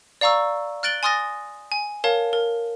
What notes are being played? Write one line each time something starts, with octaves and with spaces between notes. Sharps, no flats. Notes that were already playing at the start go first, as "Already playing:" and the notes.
D5 F5 A#5 C#6 E6
F6 F#6 A6 D7 F#7 G7
G#5 C6 D#6 F6 A6 A#6
G#5
A#4 C#5 F5 A5
A#4